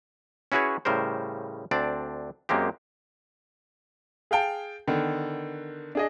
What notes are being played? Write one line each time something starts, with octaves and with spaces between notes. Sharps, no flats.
C#4 E4 F#4 G#4 B4 C#5
A2 C#3 G3 A#4 C5
D2 C4 D4 D5
F#2 G#3 A#3 C4 G4
G#4 F5 G5 A5
D3 D#3 B3
D4 G#4 D#5